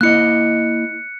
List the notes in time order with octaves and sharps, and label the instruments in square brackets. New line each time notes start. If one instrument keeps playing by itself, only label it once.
[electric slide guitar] A#3 E4 D#5 [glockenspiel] F#6 C#7